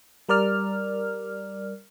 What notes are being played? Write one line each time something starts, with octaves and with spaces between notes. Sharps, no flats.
G3 A#4 D5 F6